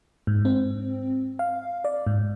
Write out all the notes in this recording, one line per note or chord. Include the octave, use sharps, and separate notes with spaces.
G#2
C4
F5
D5
G#2